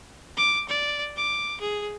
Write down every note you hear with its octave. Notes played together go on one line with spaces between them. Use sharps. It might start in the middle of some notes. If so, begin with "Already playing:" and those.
D6
D5
D6
G#4